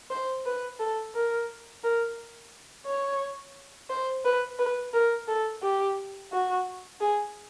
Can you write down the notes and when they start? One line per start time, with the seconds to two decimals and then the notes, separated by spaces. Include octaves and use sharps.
0.11 C5
0.46 B4
0.79 A4
1.15 A#4
1.83 A#4
2.86 C#5
3.90 C5
4.25 B4
4.59 B4
4.94 A#4
5.28 A4
5.63 G4
6.32 F#4
7.01 G#4